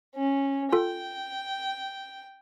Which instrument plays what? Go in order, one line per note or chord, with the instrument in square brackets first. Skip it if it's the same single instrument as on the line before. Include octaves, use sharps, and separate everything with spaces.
[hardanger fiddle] C#4
[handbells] F4 A4 [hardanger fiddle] G5